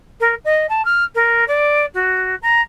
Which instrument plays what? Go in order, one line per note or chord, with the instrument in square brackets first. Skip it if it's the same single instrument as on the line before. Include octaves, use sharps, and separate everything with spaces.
[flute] A#4
D#5
A5
F6
A#4
D5
F#4
A#5